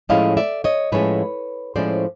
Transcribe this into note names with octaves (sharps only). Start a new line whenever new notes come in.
A2 F3 G#3 C#4 E4 D#5 F5
D5 E5
C#5 D#5
A2 F3 G#3 C#4 E4 B4 C#5
A2 F3 G#3 C#4 E4 C5 D5